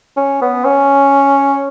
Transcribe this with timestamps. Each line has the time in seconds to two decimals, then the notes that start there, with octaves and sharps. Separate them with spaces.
0.17 C#4
0.42 B3
0.65 C#4